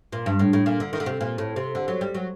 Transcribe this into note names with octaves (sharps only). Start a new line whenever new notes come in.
A#2
G2
A2
A2
A#2
D3
D#3
D3
C3
A#2
A2
C3
D3
F#3
G3
F#3